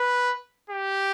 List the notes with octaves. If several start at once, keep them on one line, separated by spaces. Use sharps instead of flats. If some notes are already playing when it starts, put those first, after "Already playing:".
Already playing: B4
G4